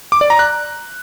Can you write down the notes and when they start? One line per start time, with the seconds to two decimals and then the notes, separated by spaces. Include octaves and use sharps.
0.12 D6
0.21 D5
0.30 A#5
0.39 F#6